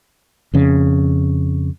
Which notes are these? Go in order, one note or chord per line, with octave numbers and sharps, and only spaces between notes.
F2 C#3